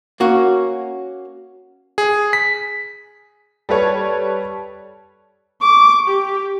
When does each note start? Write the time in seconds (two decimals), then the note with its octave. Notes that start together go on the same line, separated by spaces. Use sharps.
0.20 A#3 C#4 F#4
1.98 G#4
2.33 B6
3.69 G3 A4 B4 C#5
5.61 C#6 D6
6.07 G4